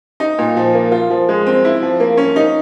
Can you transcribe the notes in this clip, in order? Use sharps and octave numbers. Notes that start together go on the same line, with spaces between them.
D#4
A#2
F3
A#3
F4
F3
G#3
C4
E4
F3
A#3
C#4
D#4